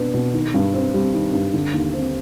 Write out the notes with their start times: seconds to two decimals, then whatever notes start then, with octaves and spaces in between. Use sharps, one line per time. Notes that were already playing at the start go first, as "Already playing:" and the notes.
Already playing: B2 B3 D4
0.14 B2
0.33 D#3
0.54 G2
0.74 C4
0.94 G3
1.14 D#3
1.33 G2
1.54 D3
1.73 D#2
1.94 C4